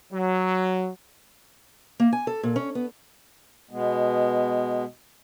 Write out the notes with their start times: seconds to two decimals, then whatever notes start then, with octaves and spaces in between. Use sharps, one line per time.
0.12 F#3
2.00 A#3
2.13 G#5
2.27 A4
2.43 A#2
2.56 C#4
2.75 B3
3.71 B2 G#3 B3